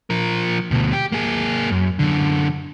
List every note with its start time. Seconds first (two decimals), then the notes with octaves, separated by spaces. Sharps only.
0.10 F3 A#4
0.71 D2 B2
0.93 G4
1.12 A#3 G#4
1.71 F#2
1.99 F#2 D3